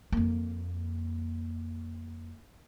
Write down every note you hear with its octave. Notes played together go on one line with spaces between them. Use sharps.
F2 A#3